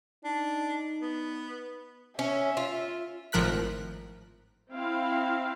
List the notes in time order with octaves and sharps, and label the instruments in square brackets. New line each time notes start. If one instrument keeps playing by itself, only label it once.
[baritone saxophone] D4 [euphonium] D#4
[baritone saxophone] B3
[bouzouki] C#4 [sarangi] E5
[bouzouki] F4
[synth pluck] G#1 A2 F3 A#4 F#6 B6
[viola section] C4 E4 F5